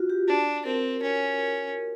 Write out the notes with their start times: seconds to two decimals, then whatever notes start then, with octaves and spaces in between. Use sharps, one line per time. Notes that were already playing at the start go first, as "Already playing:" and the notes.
Already playing: F4 F#4
0.10 G4
0.28 D4
0.65 C4 A#4
1.03 C#4